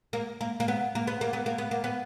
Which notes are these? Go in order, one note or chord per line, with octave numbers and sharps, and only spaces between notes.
A#3
A#3
A#3
B3
A#3
B3
A#3
B3
A#3
B3
A#3
B3